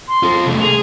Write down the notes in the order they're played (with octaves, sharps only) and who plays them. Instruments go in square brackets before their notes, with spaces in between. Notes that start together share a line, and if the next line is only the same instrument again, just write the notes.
[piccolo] C6
[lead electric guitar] F4 A4
C2 A3
[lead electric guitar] G#4 [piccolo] F7